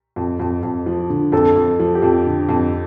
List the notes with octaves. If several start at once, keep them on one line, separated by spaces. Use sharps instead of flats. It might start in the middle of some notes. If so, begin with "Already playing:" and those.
F2
F2
F2
F3
D3
F2 A4
F2
F3
G4
F2
D3
F2